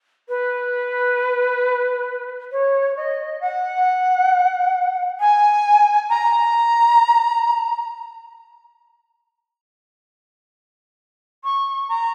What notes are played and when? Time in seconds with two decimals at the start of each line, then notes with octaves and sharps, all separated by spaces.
0.29 B4
2.52 C#5
2.97 D#5
3.41 F#5
5.20 G#5
6.09 A#5
11.44 C#6
11.89 A#5